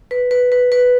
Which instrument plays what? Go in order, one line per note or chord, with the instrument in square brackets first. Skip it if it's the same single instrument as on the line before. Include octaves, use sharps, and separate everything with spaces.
[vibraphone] B4
B4
B4
B4